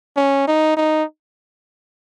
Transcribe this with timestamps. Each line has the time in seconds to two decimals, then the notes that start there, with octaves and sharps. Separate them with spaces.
0.17 C#4
0.48 D#4
0.77 D#4